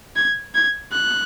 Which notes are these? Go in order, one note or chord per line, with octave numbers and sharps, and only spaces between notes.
G#6
G#6
F#6